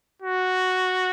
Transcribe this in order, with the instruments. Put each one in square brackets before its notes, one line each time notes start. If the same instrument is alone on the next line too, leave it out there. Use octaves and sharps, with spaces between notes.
[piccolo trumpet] F#4